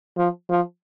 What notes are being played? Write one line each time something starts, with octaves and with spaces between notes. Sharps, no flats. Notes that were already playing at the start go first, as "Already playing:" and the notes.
F3
F3